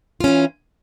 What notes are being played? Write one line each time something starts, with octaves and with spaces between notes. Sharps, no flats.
E3 C#4 F4